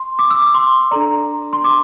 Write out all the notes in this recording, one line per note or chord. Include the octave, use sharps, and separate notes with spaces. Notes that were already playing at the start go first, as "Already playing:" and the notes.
Already playing: C6
D6
E6
D6
C6
D4 A4 D5 A#5
C6
D6